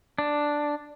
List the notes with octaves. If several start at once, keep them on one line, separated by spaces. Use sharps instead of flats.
D4